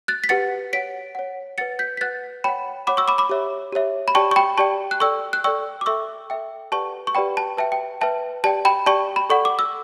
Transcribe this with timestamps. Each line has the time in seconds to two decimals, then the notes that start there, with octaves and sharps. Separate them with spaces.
0.08 F#6 A6
0.24 B6
0.29 G4 B4 F#5 A6 C#7
0.73 C#5 F#5 B6 D7
1.15 C#5 F#5
1.58 B4 F#5 A6 C#7
1.79 G6 B6
1.97 B6
2.01 B4 F#5 F#6 A6
2.44 C#5 F#5 G5 B5
2.87 C#5 F#5 B5 D6
2.97 C#6 E6
3.08 B5 D6
3.18 B5 D6
3.30 G4 C#5 E5
3.72 G4 C#5 E5
4.08 B5
4.15 G4 D5 G5 A5 C#6
4.31 C#6
4.36 G5 B5
4.58 G4 D5 G5 A5 C#6
4.91 F#6
5.00 A4 D5 G5 C#6 E6
5.33 F#6
5.44 A4 D5 G5 C#6 E6
5.81 D6
5.86 A4 E5 G5 C#6 E6
6.30 A4 E5 G5
6.72 G4 B4 D5 F#5 A5 C#6
7.07 C#6
7.15 G4 B4 D5 F#5 G5 B5
7.37 A5
7.57 B4 E5 G5 A5
7.72 G5
8.01 B4 E5 G5 A5
8.44 G4 D5 G5 A5
8.65 G5 B5
8.86 G4 D5 G5 A5 C#6
9.16 B5
9.30 A4 D5 F#5 C#6
9.45 D6
9.59 E6